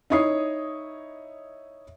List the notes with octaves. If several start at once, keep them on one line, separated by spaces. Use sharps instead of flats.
D#4 E4 C#5 D#6 C7